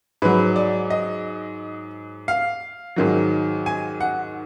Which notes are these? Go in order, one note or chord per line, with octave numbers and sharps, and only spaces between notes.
G#2 F#3 B4
D5
D#5
F5
G#2 D#3 F#3
G#5
F#5